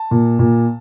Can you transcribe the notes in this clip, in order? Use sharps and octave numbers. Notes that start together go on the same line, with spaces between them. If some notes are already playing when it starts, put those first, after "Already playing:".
Already playing: A5
A#2
A#2